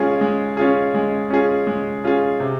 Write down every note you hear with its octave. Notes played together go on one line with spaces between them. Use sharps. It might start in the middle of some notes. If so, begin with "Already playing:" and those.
Already playing: G#3 C#4 F4 G#4
G#3
C#4 F4 G#4
G#3
C#4 F4 G#4
G#3
C#4 F4 G#4
C3